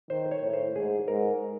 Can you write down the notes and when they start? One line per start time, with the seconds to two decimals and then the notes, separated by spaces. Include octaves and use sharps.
0.10 D#3 C5
0.31 C#5
0.42 A2
0.53 C5
0.75 G#2 G#4
1.08 G#2 A#4